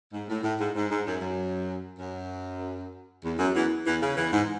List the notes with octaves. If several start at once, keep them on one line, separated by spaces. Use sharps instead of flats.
G#2
A2
A2
G#2
G#2
G#2
F#2
F#2
F#2
E2
F#2
E2 E3
E2 E3
C#3
E2 E3
G#2